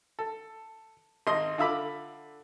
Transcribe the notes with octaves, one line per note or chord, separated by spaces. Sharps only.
A4
G#1 D#5 C6
D3 F4 E5 B5 D6